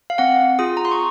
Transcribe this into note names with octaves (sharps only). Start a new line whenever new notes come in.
F5
C4 F#5
F4 G#4 D#6
A#5
C6
C#6